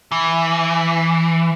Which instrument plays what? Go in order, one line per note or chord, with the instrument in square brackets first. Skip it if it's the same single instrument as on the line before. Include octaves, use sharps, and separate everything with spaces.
[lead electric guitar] E3